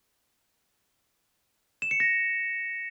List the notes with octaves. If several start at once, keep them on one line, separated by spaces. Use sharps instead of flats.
E7
C#7
A#6